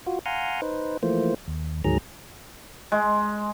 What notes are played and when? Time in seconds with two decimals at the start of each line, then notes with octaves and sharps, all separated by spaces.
0.06 F4 F#4
0.26 F5 F#5 G#5 A#5 C6
0.62 D#4 B4 C5
1.03 E3 F3 A3 A#3 C5
1.48 D#2
1.84 D2 G#2 D#3 F#3 G#4 A#5
2.92 G#3